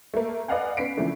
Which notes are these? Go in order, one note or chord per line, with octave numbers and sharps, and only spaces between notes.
A3 A#3
B4 D5 D#5 F5 F#5 G#5
B3 C#4 B6 C7 D7
C#3 E3 F3 A3 D4